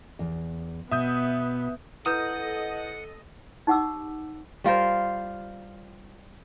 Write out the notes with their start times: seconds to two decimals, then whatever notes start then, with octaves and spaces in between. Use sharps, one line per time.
0.19 E2
0.91 B2 B3 E5 D#6 G6
2.06 E4 A4 B4 D#5 F#5 D#6 G6
3.67 D#4 G4 F#5 D6 E6
4.64 G3 F4 A#4 C5